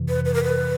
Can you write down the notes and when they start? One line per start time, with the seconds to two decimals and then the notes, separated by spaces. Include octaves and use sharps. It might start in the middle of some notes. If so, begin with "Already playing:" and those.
Already playing: F2 C3 E3
0.09 B4
0.25 B4
0.34 A#4
0.44 B4